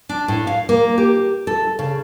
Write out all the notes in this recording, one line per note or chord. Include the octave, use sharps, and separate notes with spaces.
D4
A2
F5
A#3
G4
A4
C#3